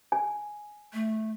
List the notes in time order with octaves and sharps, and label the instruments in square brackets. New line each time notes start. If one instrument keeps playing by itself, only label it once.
[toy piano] G#5
[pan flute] A3